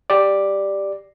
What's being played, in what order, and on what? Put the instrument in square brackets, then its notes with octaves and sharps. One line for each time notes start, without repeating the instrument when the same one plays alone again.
[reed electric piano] G4 D5